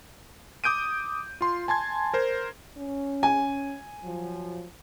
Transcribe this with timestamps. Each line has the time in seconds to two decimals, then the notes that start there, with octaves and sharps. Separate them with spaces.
0.64 D6 D#6 G6 D7 D#7
1.41 F4 C6
1.68 G#5 A5 C6 G#6
2.14 A#4 C5
2.77 C#4
3.23 G#5
4.03 F3 F#3